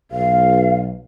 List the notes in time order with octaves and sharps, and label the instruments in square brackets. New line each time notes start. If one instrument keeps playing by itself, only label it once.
[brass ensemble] B1 [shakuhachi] F5